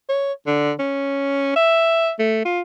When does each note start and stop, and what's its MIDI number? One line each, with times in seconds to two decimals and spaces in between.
0.09 0.32 73
0.47 0.73 50
0.79 1.51 61
1.56 2.11 76
2.19 2.44 57
2.45 2.61 65